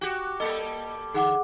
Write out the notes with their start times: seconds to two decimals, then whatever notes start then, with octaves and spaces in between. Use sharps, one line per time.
0.01 F#4 G4
0.40 G3 A#3 A4 D#5
1.14 D3 G#4 F#5 D6